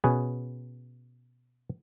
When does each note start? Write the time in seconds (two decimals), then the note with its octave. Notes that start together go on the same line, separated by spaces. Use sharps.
0.04 B2 C#4 G#4 B4